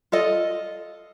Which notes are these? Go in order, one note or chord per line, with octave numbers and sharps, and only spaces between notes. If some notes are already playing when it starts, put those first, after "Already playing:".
F4 A4 D#5